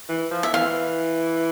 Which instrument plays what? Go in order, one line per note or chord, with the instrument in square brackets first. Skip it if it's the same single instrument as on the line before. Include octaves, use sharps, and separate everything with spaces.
[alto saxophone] E3
F3
[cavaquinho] E5
[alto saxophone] E3 [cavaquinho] F5